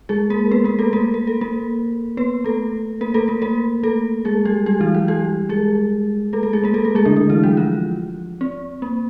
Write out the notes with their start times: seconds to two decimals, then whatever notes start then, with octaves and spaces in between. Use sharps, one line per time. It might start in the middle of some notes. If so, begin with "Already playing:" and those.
0.09 G#3 G#4
0.30 A#3 A#4
0.51 B3 B4
0.64 A#3 A#4
0.79 A3 A4
0.93 A#3 A#4
1.14 A#4
1.27 A4
1.41 A#3 A#4
2.17 B3 B4
2.44 A3 A4
3.01 A#3 A#4
3.14 A3 A4
3.28 A#3 A#4
3.42 A#3 A#4
3.83 A3 A4
4.25 G#3 G#4
4.45 G3 G4
4.66 G3 G4
4.80 E3 E4
4.94 F#3 F#4
5.08 G3 G4
5.49 G#3 G#4
6.33 A3 A4
6.43 A3 A4
6.53 G#3 G#4
6.64 A#3 A#4
6.74 A3 A4
6.85 A3 A4
6.95 G#3 G#4
7.05 D3 D4
7.16 D3 D4
7.30 E3 E4
7.43 F#3 F#4
7.57 F3 F4
8.41 C4
8.82 A#3